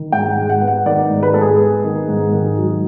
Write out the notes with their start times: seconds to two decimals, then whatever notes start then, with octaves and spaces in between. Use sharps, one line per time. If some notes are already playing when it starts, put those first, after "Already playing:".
Already playing: D#3
0.12 G#2 G5
0.31 F#5
0.37 G#3
0.50 F#5
0.61 B3
0.68 F#5
0.86 D#3 D5
1.10 G#2
1.23 B4
1.34 G#3 A4
1.41 G#4
1.59 B3
1.84 D#3
2.08 G#2
2.33 D#3
2.57 F#3